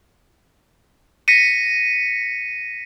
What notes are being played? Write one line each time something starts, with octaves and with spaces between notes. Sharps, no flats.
A#6 B6 C#7 D#7